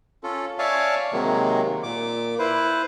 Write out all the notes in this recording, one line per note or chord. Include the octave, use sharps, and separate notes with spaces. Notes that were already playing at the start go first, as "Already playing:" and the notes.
C#4 F4 A4
C#5 D5 E5 F5 G#5 A5
C3 D#3 F#3 G#3 A#3
A#2 D6
E4 B4 C5